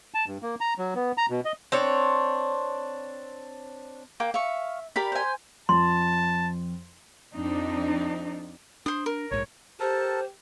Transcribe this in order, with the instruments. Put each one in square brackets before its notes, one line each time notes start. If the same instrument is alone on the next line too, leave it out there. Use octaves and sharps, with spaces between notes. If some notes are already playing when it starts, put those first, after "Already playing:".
[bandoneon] A5
G2
A#3
A#5
F#3
B3
A#5
B2
D#5
[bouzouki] C4 D4 C#5
[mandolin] A#3 [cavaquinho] G5
[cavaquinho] E5 [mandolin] F5 C#6
[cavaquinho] G4 A#4 D5 [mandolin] B5
[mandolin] C5 G#5
[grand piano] F2 [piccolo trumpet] A5 [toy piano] C6
[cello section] F2 C4 D4 D#4
[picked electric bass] D4 [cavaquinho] C5 D#6
[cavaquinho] A#4
[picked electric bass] A#1 G#2 [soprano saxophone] C#5
[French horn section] G4 [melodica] A4 A#4 A5 [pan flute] C5